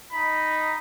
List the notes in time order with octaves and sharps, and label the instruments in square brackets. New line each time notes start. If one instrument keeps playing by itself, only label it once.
[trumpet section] D#4 [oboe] B5